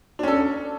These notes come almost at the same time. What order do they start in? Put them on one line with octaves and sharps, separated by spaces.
D4 C#4 A4